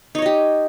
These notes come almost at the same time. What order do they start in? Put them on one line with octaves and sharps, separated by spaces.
D#4 C#5 D#5 G4